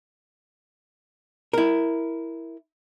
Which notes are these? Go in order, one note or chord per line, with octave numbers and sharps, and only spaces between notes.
E4 A#4